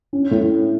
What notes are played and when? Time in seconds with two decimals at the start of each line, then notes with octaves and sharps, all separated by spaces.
0.13 C#4
0.31 A2